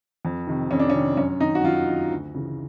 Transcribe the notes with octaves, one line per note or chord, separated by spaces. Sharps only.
F2
C3 D#3
F2 C#4
D4
C#4
C3 D#3
F#2 C#4
D#3 D#4
F#4
F#2 F4
D#3
D2
C#3 E3